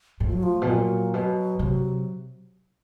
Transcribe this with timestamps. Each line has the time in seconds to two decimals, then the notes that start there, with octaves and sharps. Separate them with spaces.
0.20 A2 F3
0.32 F#3
0.43 F3
0.62 B2
0.67 A#2 F#3
1.13 B2 F#3
1.59 C3 F#3